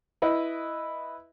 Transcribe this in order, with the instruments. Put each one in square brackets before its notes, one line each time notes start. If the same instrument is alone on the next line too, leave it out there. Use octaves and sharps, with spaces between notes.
[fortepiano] E4 B4 D#5